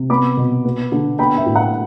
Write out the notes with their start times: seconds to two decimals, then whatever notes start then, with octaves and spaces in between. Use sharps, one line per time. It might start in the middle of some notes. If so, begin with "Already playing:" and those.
Already playing: C3
0.10 B3 B5 D6
0.37 B2
0.65 B3
0.92 D3
1.19 B3 G5 B5
1.37 E5 G5
1.46 A2
1.56 F#5